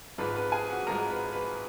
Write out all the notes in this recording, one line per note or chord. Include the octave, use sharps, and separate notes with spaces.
G#1 G#2 F3 G#3 B4 B5
B4 B5
G#4 G#5
F#4 F#5
G#1 G#2 F3 G#3 A#4 A#5
B4 B5
B4 B5